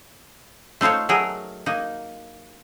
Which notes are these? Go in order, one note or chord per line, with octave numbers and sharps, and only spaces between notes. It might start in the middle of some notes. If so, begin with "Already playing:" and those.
A3 D#4 F4 C5 C#5
F#3 A3 G#4 A#4
A#3 D#4